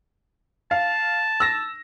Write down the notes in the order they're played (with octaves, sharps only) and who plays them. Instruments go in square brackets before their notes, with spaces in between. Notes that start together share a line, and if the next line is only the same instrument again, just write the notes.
[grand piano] F5 [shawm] A5
[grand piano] E6 A#6